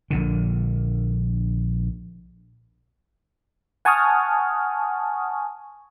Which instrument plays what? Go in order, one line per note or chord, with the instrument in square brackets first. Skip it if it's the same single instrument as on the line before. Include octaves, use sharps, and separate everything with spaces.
[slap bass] A#1 A#2 D3
[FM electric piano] F#5 G#5 A5 C#6 D#6 F6